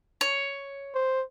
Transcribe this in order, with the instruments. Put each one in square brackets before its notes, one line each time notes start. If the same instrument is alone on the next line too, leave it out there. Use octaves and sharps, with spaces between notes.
[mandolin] C#5
[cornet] C5